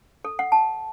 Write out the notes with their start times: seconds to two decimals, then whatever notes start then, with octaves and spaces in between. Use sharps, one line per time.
0.25 A4
0.39 F#5
0.52 A5